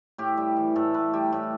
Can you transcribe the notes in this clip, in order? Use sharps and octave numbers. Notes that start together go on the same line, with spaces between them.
A2 G4
G3
E3
A2 A4
A2 B4
G3 G4
A2